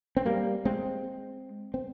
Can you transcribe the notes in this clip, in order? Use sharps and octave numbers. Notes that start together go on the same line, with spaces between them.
C4
G3 A#3
G#3 C4
C4